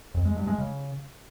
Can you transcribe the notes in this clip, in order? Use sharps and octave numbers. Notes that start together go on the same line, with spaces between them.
F2
G#3
G2
G#3
C#3